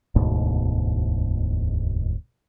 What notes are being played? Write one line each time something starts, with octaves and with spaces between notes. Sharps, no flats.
E1 D2 G#2 B2